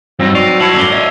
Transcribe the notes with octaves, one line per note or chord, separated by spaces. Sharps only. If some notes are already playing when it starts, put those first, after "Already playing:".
G2 F#3 C4 D#4
D5 C#6 C7 F7
G2 E4 C#5 A5 G#6 C#7 F#7
A#2 A3 C#4 E6 G7
D#5 E5